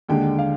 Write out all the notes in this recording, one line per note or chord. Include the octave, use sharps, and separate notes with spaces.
D#2 D3 G#3 G5
F5